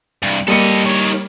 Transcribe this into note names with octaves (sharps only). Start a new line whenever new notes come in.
C2 G2
G3 A#3 A4 D#5 C#7
D#3 C#5